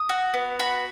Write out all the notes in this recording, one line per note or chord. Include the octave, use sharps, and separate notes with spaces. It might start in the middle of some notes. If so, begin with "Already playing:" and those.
Already playing: D#6
F#4
B3
F#4 B5